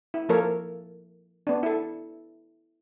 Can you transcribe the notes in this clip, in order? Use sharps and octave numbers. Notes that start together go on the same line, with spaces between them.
E4
F3 A#3 A4 A#4 C#5
B3 D4
E4 A4